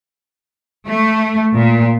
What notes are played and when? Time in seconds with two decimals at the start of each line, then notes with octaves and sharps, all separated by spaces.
0.87 A3
1.54 A#2